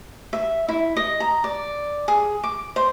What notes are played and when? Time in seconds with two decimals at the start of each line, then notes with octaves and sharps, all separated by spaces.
0.33 E5
0.69 E4
0.97 D#5
1.20 A#5
1.44 D5
2.08 G#4
2.44 D6
2.76 C5